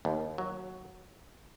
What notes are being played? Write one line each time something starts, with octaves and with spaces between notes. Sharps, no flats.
D#2
F#3